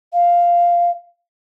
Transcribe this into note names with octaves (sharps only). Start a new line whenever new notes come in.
F5